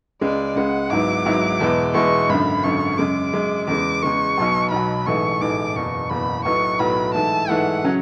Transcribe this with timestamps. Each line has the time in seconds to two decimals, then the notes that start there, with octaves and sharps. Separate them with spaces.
0.21 C#2 C#3 G#3 D5
0.55 C#2 C#3 G#3 F#5
0.90 G#1 G#2 F#3 B3 E4 D6
1.25 G#1 G#2 F#3 B3 E4
1.61 E2 B2 G#3 B3 E4
1.94 E2 B2 G#3 B3 E4 C#6
2.29 G#1 F#2 D3 B5
2.63 G#1 F#2 D3 C#6
2.98 F#2 C#3 G#3 D6
3.33 F#2 C#3 G#3
3.68 E2 C#3 G#3 D6
4.02 E2 C#3 G#3 C#6
4.38 B1 B2 F#3
4.71 B1 B2 F#3 B5
5.06 A1 G#2 E3 A3 C#6
5.41 A1 G#2 E3 A3 D6
5.75 F#1 E2 B2 C#6
6.10 F#1 E2 B2 B5
6.45 B1 A2 F#3 B3 C#6
6.79 B1 A2 F#3 B3 B5
7.14 G#2 E3 A3 E4 A5
7.49 G#2 E3 A3 E4 F#5
7.84 C#3 F#3 C#4